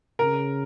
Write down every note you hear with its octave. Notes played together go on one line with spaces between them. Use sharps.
C#3 A#4